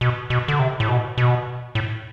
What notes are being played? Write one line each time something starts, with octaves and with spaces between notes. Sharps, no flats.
B2
B2
D3
C3
A2
B2
B2
A2